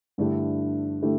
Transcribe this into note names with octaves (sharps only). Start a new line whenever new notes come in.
G2 D3 A3 E4 G4
D3 A3 E4 G4